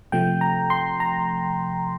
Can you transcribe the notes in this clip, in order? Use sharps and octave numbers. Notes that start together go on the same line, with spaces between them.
C3 F3 A3 G5
A#5
C6
A#5